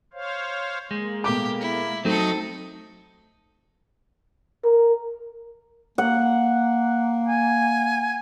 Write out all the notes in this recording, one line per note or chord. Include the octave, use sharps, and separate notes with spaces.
C5 C#5 F5
G#3 A#3
B2 A3 G4 D6
E4
F#3 A3 C4 D#4 A4 D#5 C#6 D#6
A#4
A#3 F#5
G#5